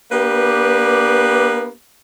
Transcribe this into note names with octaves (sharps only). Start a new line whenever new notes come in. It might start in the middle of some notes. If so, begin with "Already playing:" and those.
A#3 B3 D4 G4 B4